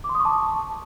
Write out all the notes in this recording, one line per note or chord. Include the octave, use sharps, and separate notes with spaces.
D6
C6
D#6
C#6
A5